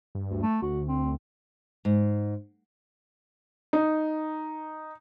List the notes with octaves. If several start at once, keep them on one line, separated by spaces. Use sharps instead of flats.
G2
D2
A3
D2 F#4
C4
G#2
D#4